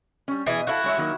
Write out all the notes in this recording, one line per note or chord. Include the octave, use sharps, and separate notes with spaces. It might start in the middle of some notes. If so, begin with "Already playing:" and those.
G3 C#4
B2 E3 G#4 D#5
E4 F#4 A4 F5
G#3 C#5 E5
D#3 F#3 A#3